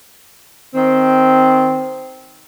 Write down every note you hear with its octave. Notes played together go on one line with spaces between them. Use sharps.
D#3 C4